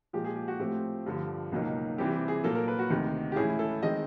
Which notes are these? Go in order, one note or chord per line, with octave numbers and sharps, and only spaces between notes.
A#2 F3 G#3 G4
G#4
G4
F#4
A2 F3 A3 C4 G4
G2 D3 F3
C#2 B2 F#3 A#3 D#4
C3 E3 G3 C4 G4
G4
G#4
A#2 F#3 A#3 A4
A#4
B4
F#4
D2 C3 D#3
G4
A2 E3 G#3 C#4 E4 G#4
A4
D#3 G#3 C4 D#5